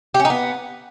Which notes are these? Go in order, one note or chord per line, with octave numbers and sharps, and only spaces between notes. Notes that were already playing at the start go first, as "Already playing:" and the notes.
G4
C#4
D#4
B3